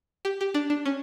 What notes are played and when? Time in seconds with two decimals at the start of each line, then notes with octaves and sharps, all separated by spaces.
0.25 G4
0.41 G4
0.54 D4
0.70 D4
0.85 C#4